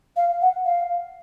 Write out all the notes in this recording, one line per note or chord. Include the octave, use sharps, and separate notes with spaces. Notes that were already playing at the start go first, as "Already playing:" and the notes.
F5
F#5
F5